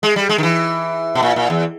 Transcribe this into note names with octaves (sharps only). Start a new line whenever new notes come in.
G#3
G3
G#3
D#3
E3
B2
A#2
A#2
E2